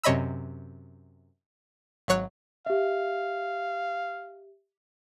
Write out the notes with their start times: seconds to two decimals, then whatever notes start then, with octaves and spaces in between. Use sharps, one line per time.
0.03 F#2 C3 C#5 D#5 B5 E6
2.08 G#1 F#3 C#5 F#6
2.66 G4 E5 F5